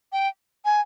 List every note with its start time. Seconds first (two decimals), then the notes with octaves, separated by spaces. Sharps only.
0.13 G5
0.65 G#5